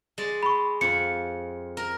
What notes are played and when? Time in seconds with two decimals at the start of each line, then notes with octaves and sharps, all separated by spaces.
0.18 G#3 D5
0.43 B5 C#6
0.81 F2 C#7
1.77 A#4